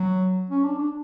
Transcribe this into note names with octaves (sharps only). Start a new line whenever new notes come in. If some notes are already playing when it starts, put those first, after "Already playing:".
Already playing: F#3
C#4
D4
D4